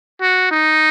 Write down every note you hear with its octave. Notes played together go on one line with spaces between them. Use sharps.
F#4
D#4